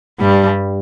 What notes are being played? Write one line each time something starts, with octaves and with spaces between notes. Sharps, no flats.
G2 G3